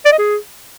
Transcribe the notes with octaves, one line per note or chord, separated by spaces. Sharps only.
D5
D#5
G#4